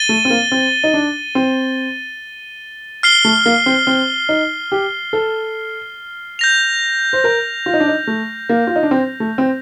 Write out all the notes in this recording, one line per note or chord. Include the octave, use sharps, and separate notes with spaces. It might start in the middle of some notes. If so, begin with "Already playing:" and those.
Already playing: A6 D#7 G7
A3
C4
A#3
C4
D#4
D4
C4
F6 C7 G7
A3
A#3
C4
C4
D#4
G4
A4
G6 A#6 F7
C5
A#4
F4
D#4
D4
D#4
A3
A#3
F4
D#4
D4
C4
A3
C4